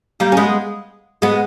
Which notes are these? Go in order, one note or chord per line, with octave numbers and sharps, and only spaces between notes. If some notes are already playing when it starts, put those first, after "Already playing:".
G3 A#3
C#4
G#3 B3
G#3 B3